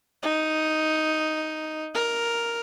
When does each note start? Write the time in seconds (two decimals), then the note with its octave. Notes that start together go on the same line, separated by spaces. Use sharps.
0.23 D#4
1.95 A#4